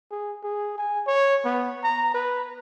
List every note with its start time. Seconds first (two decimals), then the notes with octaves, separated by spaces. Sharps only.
0.11 G#4
0.43 G#4
0.78 G#5
1.07 C#5
1.45 B3
1.83 A#5
2.14 B4